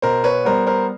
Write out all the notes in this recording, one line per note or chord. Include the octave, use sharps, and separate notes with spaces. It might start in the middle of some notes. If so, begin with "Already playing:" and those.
B2 A#4 C5
B4 C#5
G3 B3 A#4 C5
A#4 C5